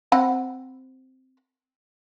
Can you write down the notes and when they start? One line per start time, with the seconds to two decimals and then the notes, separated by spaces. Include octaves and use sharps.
0.12 C4 F#5 B5